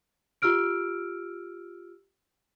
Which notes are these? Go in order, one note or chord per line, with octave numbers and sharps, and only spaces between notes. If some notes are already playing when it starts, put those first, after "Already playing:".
F4 G4 E6 F6 D7